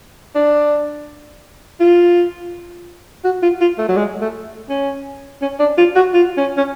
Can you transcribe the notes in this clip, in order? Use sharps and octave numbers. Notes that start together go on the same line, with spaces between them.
D4
F4
F#4
F4
F4
A3
F#3
G#3
A3
C#4
C#4
D4
F4
F#4
F4
C#4
C#4